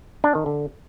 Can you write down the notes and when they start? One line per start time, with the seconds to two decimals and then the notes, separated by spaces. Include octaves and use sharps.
0.24 D4
0.35 D#3
0.46 D3